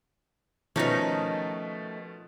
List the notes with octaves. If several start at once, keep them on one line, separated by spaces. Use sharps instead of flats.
B2 D#3 F3 A3 C#4 D#4